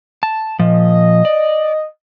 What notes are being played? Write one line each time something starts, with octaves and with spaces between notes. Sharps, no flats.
A5
A#2 F3 D#5
D5